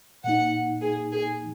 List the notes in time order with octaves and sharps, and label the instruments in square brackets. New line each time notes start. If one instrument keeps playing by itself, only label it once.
[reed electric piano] A#2 A#3 D#4 [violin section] F#5
[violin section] G#4
G#4